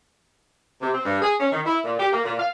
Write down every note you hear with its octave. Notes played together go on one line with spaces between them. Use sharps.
C3
C4
G2
G#4
C#4
D#3
E4
A#2
G4
A#3
A#2
F5